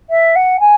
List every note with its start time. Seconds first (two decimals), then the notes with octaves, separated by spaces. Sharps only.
0.10 E5
0.36 F#5
0.60 G#5